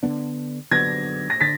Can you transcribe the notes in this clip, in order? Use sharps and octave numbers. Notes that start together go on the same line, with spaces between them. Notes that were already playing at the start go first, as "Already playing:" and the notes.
D3 F#3 B3 D4
D3 F#3 B3 D4 G#6 A#6
A#6
D3 A6 B6